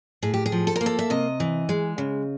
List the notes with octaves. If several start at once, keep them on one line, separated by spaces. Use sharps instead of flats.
A2 G#4
G4
G#4
F3
A4
A#4
A#3
A4
E5
C3 D#5
E3
G#3
C#3